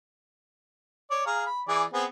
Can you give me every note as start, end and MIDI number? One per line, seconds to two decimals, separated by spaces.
1.11 1.23 73
1.11 1.23 74
1.26 1.46 68
1.26 1.46 77
1.26 1.46 82
1.46 1.62 83
1.68 1.84 52
1.68 1.84 68
1.68 1.84 74
1.93 2.05 59
1.93 2.05 60
1.93 2.05 68